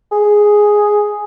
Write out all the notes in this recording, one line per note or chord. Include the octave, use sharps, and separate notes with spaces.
G#4